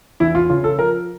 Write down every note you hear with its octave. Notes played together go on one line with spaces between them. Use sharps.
E2 E4
F4
C#3 F4
A4
F3 A#4